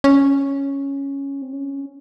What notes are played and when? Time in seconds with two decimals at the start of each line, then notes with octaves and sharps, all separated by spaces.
0.04 C#4
1.42 C4
1.53 C#4